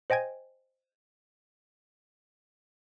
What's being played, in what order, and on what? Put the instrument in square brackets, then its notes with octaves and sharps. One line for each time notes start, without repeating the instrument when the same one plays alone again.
[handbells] C5 D#5 G5 G#5 G#6